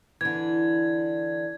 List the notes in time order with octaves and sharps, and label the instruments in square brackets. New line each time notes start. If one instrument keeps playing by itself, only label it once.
[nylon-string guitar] D3 E3 [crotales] G#6